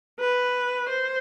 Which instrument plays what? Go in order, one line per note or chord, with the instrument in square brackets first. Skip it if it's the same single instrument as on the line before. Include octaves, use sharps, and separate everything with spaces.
[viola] B4
C5